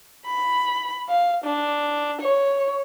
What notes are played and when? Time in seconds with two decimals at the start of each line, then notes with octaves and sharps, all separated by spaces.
0.26 B5
1.09 F5
1.44 D4
2.21 C#5